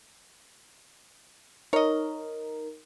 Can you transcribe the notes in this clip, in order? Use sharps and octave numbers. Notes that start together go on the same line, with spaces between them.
D#4 A#4 C#5 D#5